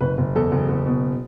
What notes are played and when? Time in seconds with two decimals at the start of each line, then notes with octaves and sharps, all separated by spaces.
0.01 F#1 B4
0.18 F#1
0.36 E2 A4
0.52 F#1
0.69 F#1
0.86 B2